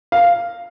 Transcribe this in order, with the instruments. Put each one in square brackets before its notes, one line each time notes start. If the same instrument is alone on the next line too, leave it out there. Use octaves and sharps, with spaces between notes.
[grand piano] F5